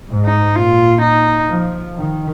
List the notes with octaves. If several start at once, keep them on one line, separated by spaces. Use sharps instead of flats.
G#2
D#4
A#2 F4
D#4
F3
D#3